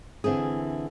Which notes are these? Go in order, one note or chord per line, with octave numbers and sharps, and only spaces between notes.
D3 E3 C4 G#4